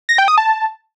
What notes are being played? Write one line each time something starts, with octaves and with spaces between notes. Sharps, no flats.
A#6
G5
D#6
A5